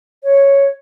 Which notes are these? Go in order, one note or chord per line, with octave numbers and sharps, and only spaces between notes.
C#5